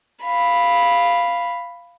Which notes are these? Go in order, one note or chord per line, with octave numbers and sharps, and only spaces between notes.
F5 B5